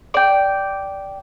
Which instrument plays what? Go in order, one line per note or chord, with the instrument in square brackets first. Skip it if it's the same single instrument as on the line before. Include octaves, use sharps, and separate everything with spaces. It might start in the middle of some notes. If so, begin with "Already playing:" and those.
[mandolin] D5 G5